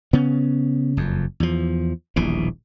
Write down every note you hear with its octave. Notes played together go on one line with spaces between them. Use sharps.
C#3 B3 C#4
F#1 F2
E2 F3
D#1 A#1 B2 E3